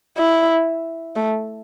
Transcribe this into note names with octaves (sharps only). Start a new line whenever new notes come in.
E4
A3